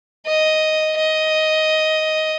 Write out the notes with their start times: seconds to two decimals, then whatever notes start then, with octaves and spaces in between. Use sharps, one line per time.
0.26 D#5
0.97 D#5